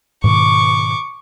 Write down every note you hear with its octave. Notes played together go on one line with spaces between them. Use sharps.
G#2 B2 D#3 C#6 D6